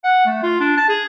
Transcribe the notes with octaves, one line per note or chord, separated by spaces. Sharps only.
F#5
A3
F4
D4
A5
G#4